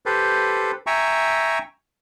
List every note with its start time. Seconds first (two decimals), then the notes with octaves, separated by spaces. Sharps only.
0.06 G4 A4 B4 C5
0.87 E5 G5 G#5 A#5 C#6